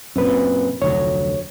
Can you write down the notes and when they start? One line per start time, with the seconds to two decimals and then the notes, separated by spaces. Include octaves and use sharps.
0.16 F#2 A#2 C4 B4
0.82 F1 D2 F#3 C#5